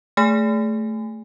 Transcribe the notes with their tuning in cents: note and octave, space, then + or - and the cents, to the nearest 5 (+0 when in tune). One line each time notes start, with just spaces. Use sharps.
A3 +0 G#4 +0 G#5 -20